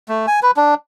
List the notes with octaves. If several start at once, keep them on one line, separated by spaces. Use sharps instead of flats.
A3
G#5
B4
D4